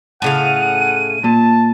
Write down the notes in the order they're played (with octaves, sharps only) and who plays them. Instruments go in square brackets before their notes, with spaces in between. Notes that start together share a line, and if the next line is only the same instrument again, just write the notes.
[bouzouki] A2 C#3 F5 [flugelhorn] F#5 [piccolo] D#7
[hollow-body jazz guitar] A#2 [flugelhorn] A5